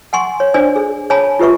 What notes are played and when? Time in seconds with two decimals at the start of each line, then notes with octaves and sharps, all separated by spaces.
0.13 F#5 G#5 C6 C#6
0.40 C#5
0.54 D4 C5 D5 G#5
0.76 G#4
1.10 C#5 G#5 A5 B5
1.39 F4 G4 B4 E5 C#6